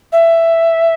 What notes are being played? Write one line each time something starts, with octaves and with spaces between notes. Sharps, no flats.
E5